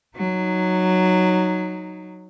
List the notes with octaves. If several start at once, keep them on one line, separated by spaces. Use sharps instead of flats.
F#3 D#4